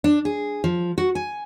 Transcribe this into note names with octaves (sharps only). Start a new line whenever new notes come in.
D4
G#4
F3
F#4
G#5